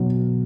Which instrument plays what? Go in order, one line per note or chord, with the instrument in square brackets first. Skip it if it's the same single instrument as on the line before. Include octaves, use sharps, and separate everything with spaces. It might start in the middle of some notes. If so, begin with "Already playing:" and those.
Already playing: [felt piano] B2 F#3